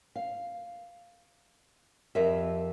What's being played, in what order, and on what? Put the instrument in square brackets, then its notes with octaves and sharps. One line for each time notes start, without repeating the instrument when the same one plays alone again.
[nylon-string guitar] F5
F2 G4 A#4 E5